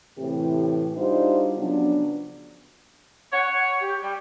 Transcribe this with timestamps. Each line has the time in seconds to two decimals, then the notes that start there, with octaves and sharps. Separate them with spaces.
0.18 A2 C3 E3 C4 G4
0.97 G3 D4 D#4 F4 F#4 C5
1.58 C#3 F3 F#3 B3 D4
3.32 C#5 F#5
3.80 G4
4.02 G3 G5